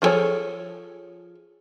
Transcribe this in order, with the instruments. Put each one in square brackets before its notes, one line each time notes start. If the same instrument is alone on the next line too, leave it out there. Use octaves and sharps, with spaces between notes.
[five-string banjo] F3 F4 G#4 A4 C#5